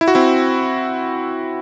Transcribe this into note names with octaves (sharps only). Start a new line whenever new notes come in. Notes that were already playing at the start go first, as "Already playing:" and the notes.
E4
F#4
C4 E4